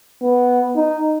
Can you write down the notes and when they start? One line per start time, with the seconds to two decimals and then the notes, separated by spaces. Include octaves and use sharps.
0.22 B3
0.76 D#4